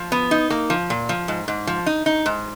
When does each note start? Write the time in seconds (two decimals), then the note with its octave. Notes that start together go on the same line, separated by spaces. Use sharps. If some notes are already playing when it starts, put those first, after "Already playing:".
Already playing: F3
0.12 B3
0.31 D#4
0.50 A#3
0.70 F3
0.90 A#2
1.09 F3
1.28 G#2
1.48 G#2
1.67 F3
1.86 D#4
2.06 D#4
2.26 G#2